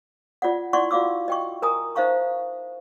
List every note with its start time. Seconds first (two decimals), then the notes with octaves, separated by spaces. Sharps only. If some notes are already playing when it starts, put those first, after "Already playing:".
0.42 F4 D5 F#5
0.73 E4 D5 F#5 C6 C#6
0.91 F4 F#4 D5 F5 D6 E6
1.28 D#5 G5 C#6
1.62 A#4 G#5 A#5 D#6
1.95 D#4 C5 E5 F5 A#5 C#6